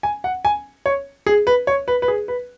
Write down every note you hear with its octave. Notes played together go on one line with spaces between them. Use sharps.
G#5
F#5
G#5
C#5
G#4
B4
C#5
B4
B4
G#4
B4